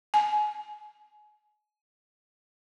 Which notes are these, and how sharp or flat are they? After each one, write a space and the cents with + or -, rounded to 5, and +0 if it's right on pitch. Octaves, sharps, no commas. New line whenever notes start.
G#5 +30